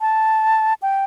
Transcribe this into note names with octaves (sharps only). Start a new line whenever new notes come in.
A5
G5